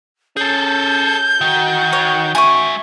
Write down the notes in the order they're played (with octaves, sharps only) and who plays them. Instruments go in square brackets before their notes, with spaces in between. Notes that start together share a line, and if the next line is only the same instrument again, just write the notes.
[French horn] C#4 [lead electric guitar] G#4 A4 [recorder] G6
[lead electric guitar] D#3 [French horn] F#4
[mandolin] C#5
[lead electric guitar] G#3 E5 [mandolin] G#5 C#6